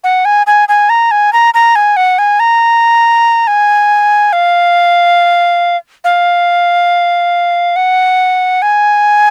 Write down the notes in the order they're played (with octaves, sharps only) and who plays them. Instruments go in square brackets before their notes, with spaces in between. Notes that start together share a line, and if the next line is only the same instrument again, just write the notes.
[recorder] F#5
G#5
G#5
G#5
A#5
G#5
A#5
A#5
G#5
F#5
G#5
A#5
G#5
F5
F5
F#5
G#5